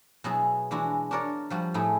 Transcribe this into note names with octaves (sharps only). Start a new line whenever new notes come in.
B2 F#3 E4 G#4
E3 G#3 D4 E4 F#4
D4 F#4 A#4 C#5 D5
F3 G3 F#4
A2 A3 E4 G#4